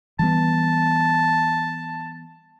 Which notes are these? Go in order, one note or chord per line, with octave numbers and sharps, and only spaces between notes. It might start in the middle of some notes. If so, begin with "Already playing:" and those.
E3 G3 B3 A5